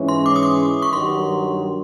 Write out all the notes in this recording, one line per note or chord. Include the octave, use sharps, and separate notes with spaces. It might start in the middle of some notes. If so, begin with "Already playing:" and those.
Already playing: G#2 E3 G#3 C#4
C6
D6
D#6
D6
C#6
G2 D#3 F#3 C6